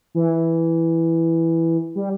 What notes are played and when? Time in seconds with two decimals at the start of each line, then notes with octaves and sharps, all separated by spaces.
0.15 E3
1.96 G3